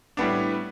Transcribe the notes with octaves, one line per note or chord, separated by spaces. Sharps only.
A2 G3 B3 D4